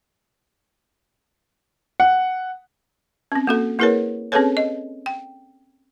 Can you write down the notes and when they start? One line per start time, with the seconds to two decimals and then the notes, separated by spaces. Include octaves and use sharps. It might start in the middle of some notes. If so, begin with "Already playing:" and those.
2.00 F#5
3.32 C4 C#4
3.47 A#3 F#4 A4
3.79 A#3 E4 G#4 A#4 B4 C#5
4.32 C4 C#4 G#4 A4 B4 C#5
4.57 D#5
5.06 G5